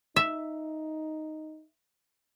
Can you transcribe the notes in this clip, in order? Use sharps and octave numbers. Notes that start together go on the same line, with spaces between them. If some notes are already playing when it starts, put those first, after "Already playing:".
D#4 E5